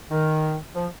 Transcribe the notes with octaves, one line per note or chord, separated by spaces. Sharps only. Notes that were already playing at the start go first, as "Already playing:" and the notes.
D#3
F3